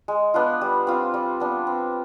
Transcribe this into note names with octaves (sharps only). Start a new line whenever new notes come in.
G#3
B3 D4 F4
G3
C4 F4
G3
B3 D4
C4